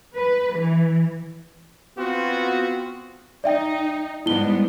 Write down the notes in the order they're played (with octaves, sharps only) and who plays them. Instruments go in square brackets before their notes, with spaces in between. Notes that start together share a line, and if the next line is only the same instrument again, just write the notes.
[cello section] B4
E3
[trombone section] B3 C4 F4 F#4
[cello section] D#4 [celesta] D5 E5 G5
[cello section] G#2 G3 B3 [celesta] E4 G7